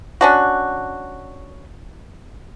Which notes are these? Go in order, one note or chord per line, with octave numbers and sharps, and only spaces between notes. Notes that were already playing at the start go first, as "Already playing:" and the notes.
C#4 D4 F#4